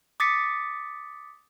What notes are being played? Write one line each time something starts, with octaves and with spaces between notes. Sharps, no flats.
D6 D#6 A6 B6 C#7